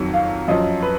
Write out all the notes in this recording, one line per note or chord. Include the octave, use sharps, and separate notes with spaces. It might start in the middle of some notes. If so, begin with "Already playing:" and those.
Already playing: F2 D#3 F#3
F5
F#2 F3 D#5
B4